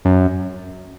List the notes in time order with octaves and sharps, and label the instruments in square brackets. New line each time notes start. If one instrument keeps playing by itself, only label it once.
[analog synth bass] F#2